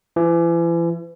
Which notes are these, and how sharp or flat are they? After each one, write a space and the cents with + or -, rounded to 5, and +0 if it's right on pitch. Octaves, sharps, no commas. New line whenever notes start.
E3 +40